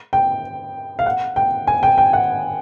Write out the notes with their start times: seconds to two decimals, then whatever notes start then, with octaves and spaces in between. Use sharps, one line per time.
0.13 G5
0.99 F5
1.06 F#5
1.36 G5
1.67 G#5
1.83 G5
1.98 G5
2.13 F#5